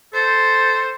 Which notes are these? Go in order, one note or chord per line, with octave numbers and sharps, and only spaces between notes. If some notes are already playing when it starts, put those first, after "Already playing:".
A4 C5